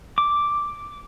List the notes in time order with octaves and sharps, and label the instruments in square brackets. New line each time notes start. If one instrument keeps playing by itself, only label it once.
[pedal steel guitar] D6